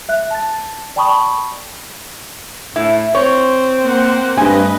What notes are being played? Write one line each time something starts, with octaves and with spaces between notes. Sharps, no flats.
E5 F#6
A5 A6
D5 G5 A5 B5 C#6 D#6
A2 E4
C4 C#5
A#3 C5 F#5
G2 A3 B4 D#5 G#5